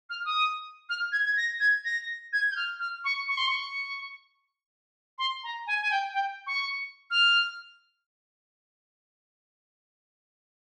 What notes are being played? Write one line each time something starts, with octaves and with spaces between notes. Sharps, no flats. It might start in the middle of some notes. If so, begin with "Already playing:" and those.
F6
D#6
F6
G#6
G#6
A#6
G#6
A#6
G#6
G6
F6
F6
C#6
C#6
C6
C#6
C6
A#5
G#5
G#5
G5
G5
C#6
F6